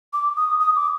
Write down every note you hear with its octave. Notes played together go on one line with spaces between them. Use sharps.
D6
D#6
D#6
D6